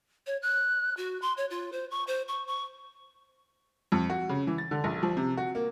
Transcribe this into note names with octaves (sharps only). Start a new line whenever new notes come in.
C#5
F#6
F#4
C6
C#5
F4
C5
C#6
C5
C#6
C#6
F2
F#4
C#3
E3
A6
D3
A#1
F3
C3
F#4
A#3